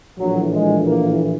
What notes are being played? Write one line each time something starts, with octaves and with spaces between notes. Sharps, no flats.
A#1 A2 E3 F#3
G#3
A#3